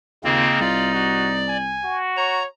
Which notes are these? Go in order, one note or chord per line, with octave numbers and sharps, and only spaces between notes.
D#2 C#3 A#3 C4 D#4 F4
C2 F4 D5
F#4
G#5
F#4
C#5 A#5